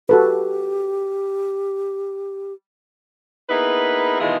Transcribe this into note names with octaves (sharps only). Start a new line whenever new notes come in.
F#4 G4 A4 B4
A#3 B3 D#4 E4 G#4 B4
B2 D#3 E3 G#3 F4 G#4